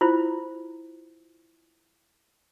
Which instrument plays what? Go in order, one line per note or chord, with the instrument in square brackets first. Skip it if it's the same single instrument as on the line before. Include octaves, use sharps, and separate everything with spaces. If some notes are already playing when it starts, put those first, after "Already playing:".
[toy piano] E4 F4 C5